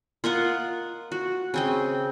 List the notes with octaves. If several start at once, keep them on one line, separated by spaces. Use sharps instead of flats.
F4 A#4 D#5 F#5
F#4
C#3 C4 D#5